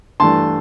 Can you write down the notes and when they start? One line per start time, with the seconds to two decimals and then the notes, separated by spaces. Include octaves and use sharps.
0.20 G2 E3 A3 D4 A5 C6